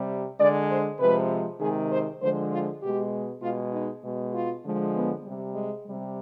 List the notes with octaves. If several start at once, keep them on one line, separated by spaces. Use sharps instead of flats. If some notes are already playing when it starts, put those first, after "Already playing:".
Already playing: C3 G3
D3 G#3 D5
C5
C3 F3 G#3 B4
C3 D#3 G#3 G#4
C5
D3 F3 G#3 C5
F4
B2 G#3 G4
B2 G#3 F4
D#4
B2 G#3
F4
D3 F3 G#3
B3
C3 G3
G#3
C3 G3